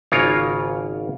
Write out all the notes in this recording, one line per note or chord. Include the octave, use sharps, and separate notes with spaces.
G#1 C#3 A#3 F4 A#4 C#5